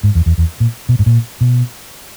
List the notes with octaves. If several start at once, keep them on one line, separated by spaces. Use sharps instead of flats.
G#2
E2
E2
E2
A#2
B2
G#2
A#2
B2